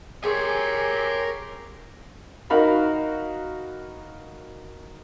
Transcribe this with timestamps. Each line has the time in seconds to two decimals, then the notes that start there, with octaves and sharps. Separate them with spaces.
0.24 G4 G#4 A#4 C#5 G#5 C6
2.50 D#4 F#4 A#4 F5 B5